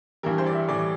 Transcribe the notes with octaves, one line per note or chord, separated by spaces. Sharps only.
G2 E3 G3 A#4
C5
D5
E5
A2 E3 G3 D5